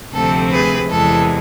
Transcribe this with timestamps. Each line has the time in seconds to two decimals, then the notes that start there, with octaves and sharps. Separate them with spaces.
0.13 D2 C3 F3 A3 C4 A4
0.51 G#4 B4
0.89 E2 C3 E3 G#3 A4